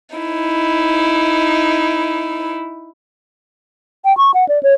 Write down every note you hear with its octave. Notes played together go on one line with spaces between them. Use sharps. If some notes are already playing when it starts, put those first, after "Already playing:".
D#4 E4
G5
C#6
F#5
D5
C#5